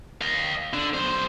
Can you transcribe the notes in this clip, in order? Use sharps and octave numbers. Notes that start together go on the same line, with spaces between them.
D#5 F5
D3
B1 C5